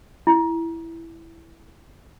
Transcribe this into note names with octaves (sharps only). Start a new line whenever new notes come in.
E4